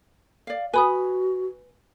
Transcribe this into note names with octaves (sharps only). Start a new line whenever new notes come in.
D5 F5
F#4 B4 G#5 B5 D#6